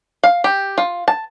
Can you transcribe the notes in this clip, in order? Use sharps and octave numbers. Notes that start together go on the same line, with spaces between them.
F5
G4
F4
A5